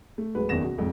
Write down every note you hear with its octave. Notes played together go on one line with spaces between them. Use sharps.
A3
D1 F#3 G#3 B4
F#1 E2 D#3 A#6 E7
B2
F1 F2 G#2